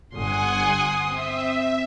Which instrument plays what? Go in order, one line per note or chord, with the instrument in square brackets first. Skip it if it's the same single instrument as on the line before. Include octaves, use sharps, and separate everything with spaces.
[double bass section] G1 [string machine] F#5 G#5 [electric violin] C6 D#6
[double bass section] C4 [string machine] E5